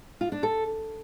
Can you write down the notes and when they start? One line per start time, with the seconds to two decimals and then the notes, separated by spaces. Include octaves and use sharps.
0.21 F4
0.32 D4
0.43 A4